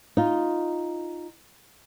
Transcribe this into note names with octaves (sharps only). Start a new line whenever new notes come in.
D#4 F4